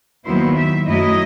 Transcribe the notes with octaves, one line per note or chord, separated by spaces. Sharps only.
D#2 D#3 F#3 B3 E4 C5
E5
F#2 F#3 A3 E4 D#5